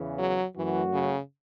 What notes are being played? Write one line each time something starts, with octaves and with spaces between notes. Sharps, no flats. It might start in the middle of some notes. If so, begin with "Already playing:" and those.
Already playing: E2 C#3 E3
F#3
F#2 E3 F#3 A3 F#4
C#3